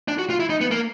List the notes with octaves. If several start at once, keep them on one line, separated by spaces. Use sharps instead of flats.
D4
F#4
F4
E4
D#4
B3
A#3